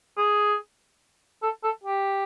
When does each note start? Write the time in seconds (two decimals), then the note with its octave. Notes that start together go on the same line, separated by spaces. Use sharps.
0.18 G#4
1.43 A4
1.64 A4
1.84 G4